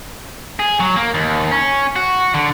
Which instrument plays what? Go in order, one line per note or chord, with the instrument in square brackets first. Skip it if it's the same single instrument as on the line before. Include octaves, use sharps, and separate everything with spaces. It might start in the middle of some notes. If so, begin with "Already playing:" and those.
[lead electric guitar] G#4
F#3
A#3
D#2
C#4
F#4
D3